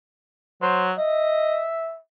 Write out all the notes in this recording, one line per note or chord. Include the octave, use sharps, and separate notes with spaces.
F#3 C5
D#5 E5